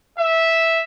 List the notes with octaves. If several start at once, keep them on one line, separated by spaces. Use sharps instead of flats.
E5